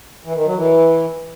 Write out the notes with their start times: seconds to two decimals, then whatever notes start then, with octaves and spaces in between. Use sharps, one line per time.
0.24 E3
0.35 D#3
0.45 F#3
0.56 E3